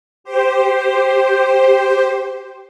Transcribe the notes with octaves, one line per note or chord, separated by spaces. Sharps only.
G4 C5